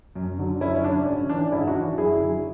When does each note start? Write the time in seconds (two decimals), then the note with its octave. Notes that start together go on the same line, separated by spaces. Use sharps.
0.15 F#2
0.38 D3 F#3
0.61 F#2 C#4 E4
0.74 C#4
0.84 D3 F#3 D4
1.06 G#2 C#4
1.29 E3 D4
1.52 G#2 C#4 E4
1.67 D4 F#4
1.75 E3
1.98 F#2 E4 G#4
2.20 D3 F#3